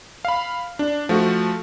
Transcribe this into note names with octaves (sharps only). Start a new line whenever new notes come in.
F5 B5
D4
F3 A3 F#4